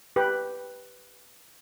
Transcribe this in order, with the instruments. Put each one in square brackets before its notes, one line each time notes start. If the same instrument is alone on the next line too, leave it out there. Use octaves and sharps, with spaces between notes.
[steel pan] G4 B4